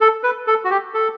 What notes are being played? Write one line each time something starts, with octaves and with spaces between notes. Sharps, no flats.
A4
B4
A4
F#4
G4
A4